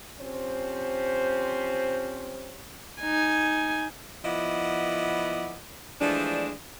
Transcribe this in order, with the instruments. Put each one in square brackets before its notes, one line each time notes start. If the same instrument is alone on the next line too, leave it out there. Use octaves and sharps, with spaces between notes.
[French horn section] F3 C4 C#4 G4 C5
[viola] D#4 G#5
[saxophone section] F3 B3 E4 D5 D#5 F#5
E3 F3 G#3 A3 D4